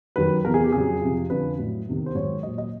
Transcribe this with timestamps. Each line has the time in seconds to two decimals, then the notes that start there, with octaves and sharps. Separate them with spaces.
0.16 F#2 D#3 F#3 B4
0.45 E2 C3 E3 A#4
0.54 G#4
0.64 G4
0.72 F2 C#3 F#3 G#4
1.01 F2 C3 F3
1.30 F2 D3 F3 B4
1.58 A2 F#3
1.87 E2 C3 D#3
2.06 C5
2.15 G#2 D#3 F#3 C#5
2.43 A#2 F#3 D#5
2.58 D#5